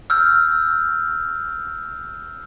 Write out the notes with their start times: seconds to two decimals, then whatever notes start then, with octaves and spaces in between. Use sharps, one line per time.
0.10 E6 F6 G6